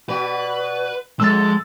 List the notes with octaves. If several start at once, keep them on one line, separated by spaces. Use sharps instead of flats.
B2 F#4 B4 D5
F2 G#3 A4 E6 A6